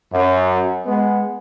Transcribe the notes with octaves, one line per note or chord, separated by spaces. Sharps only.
F#2
G#3 B3